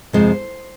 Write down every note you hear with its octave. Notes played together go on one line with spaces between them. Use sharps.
F2 C3 F3 G#3 C5